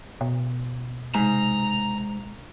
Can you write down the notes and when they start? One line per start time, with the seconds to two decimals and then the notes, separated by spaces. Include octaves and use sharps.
0.21 B2
1.15 G#2 C3 D#3 A#5